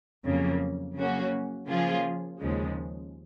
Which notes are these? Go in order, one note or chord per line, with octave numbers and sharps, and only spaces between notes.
F2 C#3 F#3 A#3
C#3 F#3 A#3 C#4 F#4
C#3 F3 A#3 F4 G#4
D#2 C#3 F3 G#3